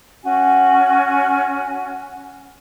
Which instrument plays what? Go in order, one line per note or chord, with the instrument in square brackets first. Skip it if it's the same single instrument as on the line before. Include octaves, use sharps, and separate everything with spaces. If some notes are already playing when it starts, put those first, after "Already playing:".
[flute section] C#4 F#4 G#5